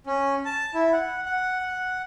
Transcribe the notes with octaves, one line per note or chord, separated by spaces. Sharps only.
C#4
A5
E4
F#5
F#5